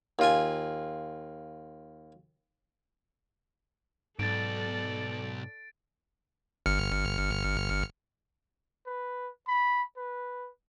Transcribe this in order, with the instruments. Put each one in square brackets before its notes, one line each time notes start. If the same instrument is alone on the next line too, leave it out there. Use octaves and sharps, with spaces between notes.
[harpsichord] D#2 F4 G#5
[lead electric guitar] B1 B2 [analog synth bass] G#2 [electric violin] A4 D5 [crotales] A6 D7
[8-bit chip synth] G1 F6 C#7
[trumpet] B4
B5
B4